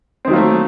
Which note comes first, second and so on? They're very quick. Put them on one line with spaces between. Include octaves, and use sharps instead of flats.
C4 D#3 F#3 A#3 A3